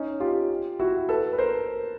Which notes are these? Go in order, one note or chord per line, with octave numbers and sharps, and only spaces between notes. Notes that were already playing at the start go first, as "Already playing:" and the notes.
Already playing: C#4 D#4
F4 G4
E4 F#4
A4 B4
B4
A#4 C5